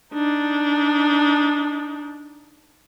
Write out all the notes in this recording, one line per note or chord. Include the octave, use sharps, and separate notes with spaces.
D4 D#4